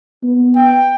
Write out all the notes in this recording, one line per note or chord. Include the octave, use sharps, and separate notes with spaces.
B3
G5